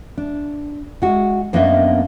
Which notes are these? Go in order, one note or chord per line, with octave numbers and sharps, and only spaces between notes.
D4
G#3 F#4
F#2 A#3 B3 D4 D#5 E5